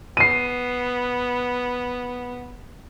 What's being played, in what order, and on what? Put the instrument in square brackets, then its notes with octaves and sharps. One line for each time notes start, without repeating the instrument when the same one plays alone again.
[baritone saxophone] B3 [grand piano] C7 D#7